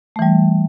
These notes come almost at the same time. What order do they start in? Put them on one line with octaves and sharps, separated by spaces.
A3 E3 G3